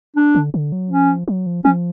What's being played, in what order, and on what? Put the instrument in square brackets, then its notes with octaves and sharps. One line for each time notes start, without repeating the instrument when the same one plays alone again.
[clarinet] D4
[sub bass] D3
D3
F#3
[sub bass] F3 [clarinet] C#4
[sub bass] F#3
F3
[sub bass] F3 [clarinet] C#4